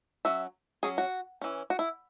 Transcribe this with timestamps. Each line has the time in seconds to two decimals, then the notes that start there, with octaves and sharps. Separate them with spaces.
0.25 F#3 C#4 E5
0.83 F#3 C#4 G#4
0.98 F#4
1.41 E3 C#4
1.70 F#4
1.79 E4